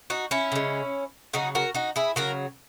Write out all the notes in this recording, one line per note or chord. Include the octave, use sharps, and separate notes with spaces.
D#4 F#4
C#4 E4
C#3 G#3
C#3 F#3 D#4 F#4
F#4 A#4
D#4 F#4
E4 G#4
C#3 F#3 F#4 A#4